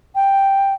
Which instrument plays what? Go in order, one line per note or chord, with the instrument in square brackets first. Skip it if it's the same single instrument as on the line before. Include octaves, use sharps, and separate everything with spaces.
[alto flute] G5